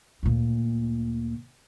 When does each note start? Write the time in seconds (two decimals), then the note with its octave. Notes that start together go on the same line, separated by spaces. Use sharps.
0.23 D2 A#2